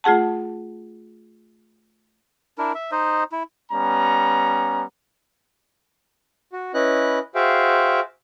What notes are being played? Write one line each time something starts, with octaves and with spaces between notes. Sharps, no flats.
A3 F4 G#4 F#5 A5
D4 E4 A#4
E5
D#4 C5 D#5
E4
G3 B3 C#4 A#5
F#4
C#4 E4 B4 D#5 F#6
F#4 G#4 C5 E5 F5 G5